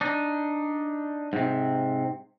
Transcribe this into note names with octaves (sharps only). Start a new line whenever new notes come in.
D4 D#4
G#2 C3